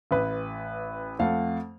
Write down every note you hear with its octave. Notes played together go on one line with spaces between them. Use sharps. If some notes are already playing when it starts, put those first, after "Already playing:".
A1 B4
F2 A3 F5 F#5